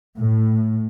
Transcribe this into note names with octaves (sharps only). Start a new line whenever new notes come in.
A2